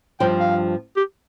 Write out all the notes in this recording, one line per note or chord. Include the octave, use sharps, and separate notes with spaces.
G2 F3 C4 G5
F5
G4